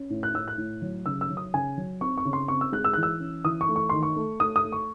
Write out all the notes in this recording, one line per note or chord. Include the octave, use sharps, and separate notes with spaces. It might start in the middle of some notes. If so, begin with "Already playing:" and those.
Already playing: C#4
A2
F#6
A2 E6
F#6
A2
F#3
C#3 E6
E6
F#3
D#6
C#3 G#5
F#3
C4 C#6
C#6
C#3
C6
C4 C#6
E6
G#3 F#6
E6
E3 F#6
E6
C#4
E3 D#6
C#6
A3
C#6
D#3 C6
C#6
A3
A3 D#6
D#6
A3
C#6